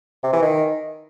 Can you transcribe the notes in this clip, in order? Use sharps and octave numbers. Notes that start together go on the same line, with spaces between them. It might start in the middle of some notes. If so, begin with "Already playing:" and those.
C3
E3
D#3